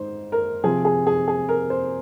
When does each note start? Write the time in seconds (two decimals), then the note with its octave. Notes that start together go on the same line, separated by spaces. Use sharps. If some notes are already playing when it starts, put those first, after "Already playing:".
Already playing: G#2 D#4 C5
0.32 A#4
0.64 C3 F3 C4 G#4
0.85 G#4
1.07 G#4
1.28 G#4
1.49 A#4
1.70 C5